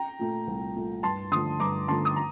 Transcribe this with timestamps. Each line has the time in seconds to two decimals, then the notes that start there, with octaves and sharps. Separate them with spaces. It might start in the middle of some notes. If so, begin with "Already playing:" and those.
Already playing: G5 A#5
0.19 A#2 A3
0.47 C2
0.75 A#2 A3
1.03 G2 A5 C6
1.32 D3 F3 A3 C6 D#6
1.60 G2 A#5 D6
1.88 D3 F3 A3 A5 C6
2.05 D#6
2.16 A#5